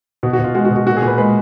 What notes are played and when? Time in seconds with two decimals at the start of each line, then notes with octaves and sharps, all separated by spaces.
0.23 B2 F#4
0.33 F#4
0.39 B2
0.44 F4
0.54 G#3 F#4
0.65 F#4
0.71 B2
0.76 F#4
0.87 A#2 F#4
0.97 G#4
1.02 A#2
1.07 B4
1.18 G#3 B4